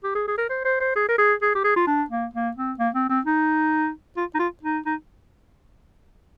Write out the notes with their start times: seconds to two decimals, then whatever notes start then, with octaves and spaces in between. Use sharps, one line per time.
0.04 G4
0.15 G#4
0.28 G#4
0.38 A#4
0.50 C5
0.65 C5
0.80 C5
0.96 G#4
1.09 A#4
1.18 G#4
1.42 G#4
1.55 G4
1.64 G#4
1.76 F4
1.87 D4
2.10 A#3
2.33 A#3
2.57 C4
2.79 A#3
2.95 C4
3.09 C4
3.25 D#4
4.17 F4
4.35 D#4
4.39 F4
4.63 D#4
4.86 D#4